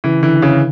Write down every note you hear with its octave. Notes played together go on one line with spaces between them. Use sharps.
C#3 E3
D3 E3
C#3